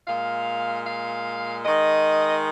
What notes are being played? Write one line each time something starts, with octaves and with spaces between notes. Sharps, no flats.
A#2 G#3 F5
F5
D#3 G#3 D#5